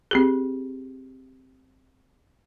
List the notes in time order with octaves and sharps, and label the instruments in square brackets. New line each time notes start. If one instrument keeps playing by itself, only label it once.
[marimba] C4 G4 G#4